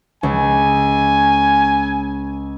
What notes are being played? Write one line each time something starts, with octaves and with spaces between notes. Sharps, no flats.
C#2 G#5